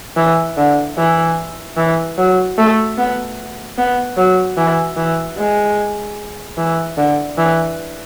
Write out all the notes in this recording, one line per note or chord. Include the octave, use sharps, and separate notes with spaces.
E3
D3
E3
E3
F#3
A3
B3
B3
F#3
E3
E3
G#3
E3
D3
E3